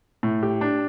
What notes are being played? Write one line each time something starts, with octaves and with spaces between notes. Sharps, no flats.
A2
G4
D4